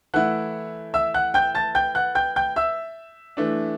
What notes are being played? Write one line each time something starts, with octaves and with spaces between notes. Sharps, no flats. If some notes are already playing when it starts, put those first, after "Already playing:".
E3 A3 E4 F#5 F#6
E5 E6
F#5 F#6
G5 G6
A5 A6
G5 G6
F#5 F#6
G5 G6
G5 G6
E5 E6
E3 A3 D4